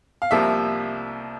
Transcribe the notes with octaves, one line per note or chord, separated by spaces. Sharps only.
F5
C2 C3 F3 A#3 E5